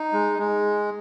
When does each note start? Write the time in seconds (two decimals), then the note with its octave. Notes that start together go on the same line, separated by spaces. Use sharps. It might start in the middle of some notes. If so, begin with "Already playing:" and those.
Already playing: D#4
0.13 G#3
0.39 G#3